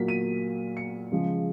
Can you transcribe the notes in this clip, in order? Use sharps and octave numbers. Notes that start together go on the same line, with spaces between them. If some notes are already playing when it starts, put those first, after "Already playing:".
Already playing: A#2 F#3 A#3 B6
D#7
C#7
C#3 F3 G#3